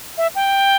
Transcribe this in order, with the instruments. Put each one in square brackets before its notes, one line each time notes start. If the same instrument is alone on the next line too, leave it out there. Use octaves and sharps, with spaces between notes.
[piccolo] E5
G5